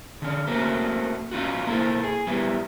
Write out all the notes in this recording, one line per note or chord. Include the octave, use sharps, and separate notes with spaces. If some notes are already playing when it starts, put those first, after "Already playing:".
D3 C#4
A3 A#3 C4 C#4 F#4
C#4 D#4 F4 F#4
A#3 E4 A4 C5
G#4
G3 B3 E4